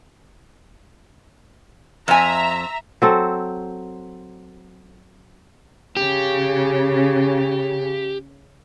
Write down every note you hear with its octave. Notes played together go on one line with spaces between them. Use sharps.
F2 E5 G#5 A#5
F#3 C4 A4
C#3 G4